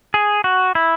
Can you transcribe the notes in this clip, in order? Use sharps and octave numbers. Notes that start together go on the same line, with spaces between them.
G#4
F#4
E4